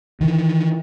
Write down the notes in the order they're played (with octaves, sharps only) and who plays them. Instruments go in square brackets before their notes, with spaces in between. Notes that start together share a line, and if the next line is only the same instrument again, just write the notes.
[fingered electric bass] D#3 E3